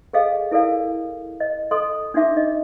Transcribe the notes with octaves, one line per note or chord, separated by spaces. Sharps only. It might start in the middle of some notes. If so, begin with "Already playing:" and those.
G#4 A4 D#5 F5
E4 A4 A#4 D5 F5
D#5
A4 D#5 C6 D#6
D4 D#4 F#4 E5 A5 D6
D#5